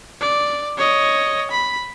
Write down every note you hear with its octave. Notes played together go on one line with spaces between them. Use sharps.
D5
C#5 D#5
B5